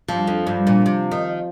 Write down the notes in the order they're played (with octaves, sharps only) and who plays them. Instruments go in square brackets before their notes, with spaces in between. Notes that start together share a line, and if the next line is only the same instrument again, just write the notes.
[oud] G2 [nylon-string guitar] F3
[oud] F2
G2
A#2
C3
D#3